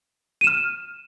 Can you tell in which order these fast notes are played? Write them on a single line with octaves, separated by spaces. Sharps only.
D#7 E7 F6